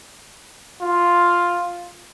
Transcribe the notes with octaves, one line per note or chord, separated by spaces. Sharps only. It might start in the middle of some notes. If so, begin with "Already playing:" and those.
F4